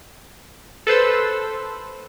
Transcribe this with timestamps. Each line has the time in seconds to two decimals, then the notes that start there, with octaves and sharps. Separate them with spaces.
0.87 A4 B4 C5 E6